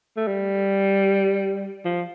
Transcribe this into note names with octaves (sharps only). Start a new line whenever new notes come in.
A3
G3
F3